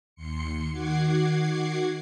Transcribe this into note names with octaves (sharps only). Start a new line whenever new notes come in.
D#2 C6 C#7
D#3 F#4 F#5 D6 G#6 C7